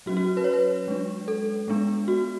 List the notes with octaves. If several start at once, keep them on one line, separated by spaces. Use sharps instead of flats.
F#3 C#4 F#4
F#4
B4
C#5
B4
G#3 D4
A4
G#3 B3 D4
F#4